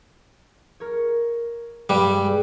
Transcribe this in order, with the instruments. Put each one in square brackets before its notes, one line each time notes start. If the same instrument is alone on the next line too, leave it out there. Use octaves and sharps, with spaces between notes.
[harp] A#4 C#5
[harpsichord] G2 G3
[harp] G#3